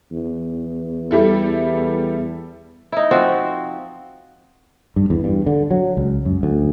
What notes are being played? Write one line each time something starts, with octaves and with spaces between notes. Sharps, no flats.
E2
G3 E4 A4
D#4 E4
F3 C4 F#4
G2
E2
G2
D3
F#3
C#2
F#2
D2